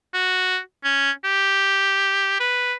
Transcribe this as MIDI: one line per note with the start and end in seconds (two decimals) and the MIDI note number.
0.14 0.59 66
0.84 1.11 61
1.24 2.38 67
2.40 2.74 71